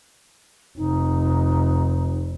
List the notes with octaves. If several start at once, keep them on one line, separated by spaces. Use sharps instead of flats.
F1 D#4